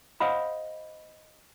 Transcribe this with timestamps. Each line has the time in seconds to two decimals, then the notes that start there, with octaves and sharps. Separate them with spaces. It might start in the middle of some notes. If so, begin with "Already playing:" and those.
0.20 C5 D#5 F5 F#5 B5